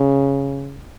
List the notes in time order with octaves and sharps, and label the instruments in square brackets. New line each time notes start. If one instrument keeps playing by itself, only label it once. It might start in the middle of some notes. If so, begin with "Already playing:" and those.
Already playing: [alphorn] C#3